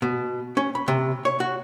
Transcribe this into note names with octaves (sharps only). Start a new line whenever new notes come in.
B2
C#4
B5
C3
C#5
F#4